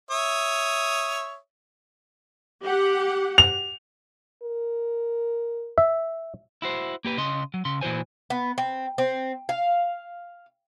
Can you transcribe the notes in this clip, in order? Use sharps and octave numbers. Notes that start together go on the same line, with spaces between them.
C#5 E5 D#6
G4 F#5
F7
A#4
E5
E4 F#4 C5
A#3 G4 B4
C#3 D#5 C6
F#3
C#3 C6
A#2 E3 F#4 C5 G#5
B3
C4
C4
F5